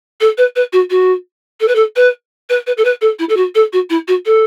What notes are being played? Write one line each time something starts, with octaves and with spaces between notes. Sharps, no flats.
A4
B4
B4
F#4
F#4
A4
B4
A4
B4
B4
B4
A4
B4
A4
E4
A4
F#4
A4
F#4
E4
F#4
A4